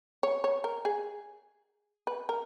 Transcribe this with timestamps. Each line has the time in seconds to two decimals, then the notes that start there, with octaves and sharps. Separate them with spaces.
0.23 C#5
0.44 C#5
0.64 A#4
0.85 G#4
2.07 B4
2.29 A#4